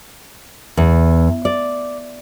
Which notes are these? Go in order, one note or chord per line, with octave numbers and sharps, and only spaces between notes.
E2
D5